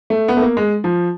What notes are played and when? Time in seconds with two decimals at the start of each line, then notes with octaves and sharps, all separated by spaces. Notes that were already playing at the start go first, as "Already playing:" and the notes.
0.10 A3
0.28 B3
0.37 A3
0.42 A#3
0.57 G#3
0.84 F3